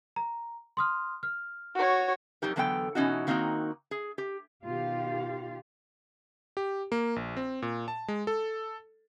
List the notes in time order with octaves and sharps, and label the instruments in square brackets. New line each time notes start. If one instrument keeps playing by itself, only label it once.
[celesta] A#5
C6 D#6 F6
F6
[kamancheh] F#4 C#5
[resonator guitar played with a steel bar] F2 F#3 D#4 G4 A#4
E2 D3 F#3 B3 A4 G5
B2 E3 C#4 D#4 F#4
D#3 A#3 C4 D#4 F#4 A#5
G#4
G4
[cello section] B2 D#3 F4 G4 F5
[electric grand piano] G4
A#3
A#1
C4
A#2
A5
G#3
A4